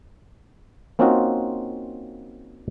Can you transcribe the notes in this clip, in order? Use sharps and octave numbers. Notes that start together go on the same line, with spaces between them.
A#3 C4 C#4 D#4 F4 F#4